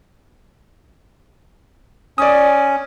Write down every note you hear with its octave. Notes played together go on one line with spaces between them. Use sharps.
C#4 D5 D#6